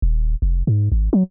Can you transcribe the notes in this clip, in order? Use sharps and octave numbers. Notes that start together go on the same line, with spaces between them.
D#1
F1
G#2
G#1
F#3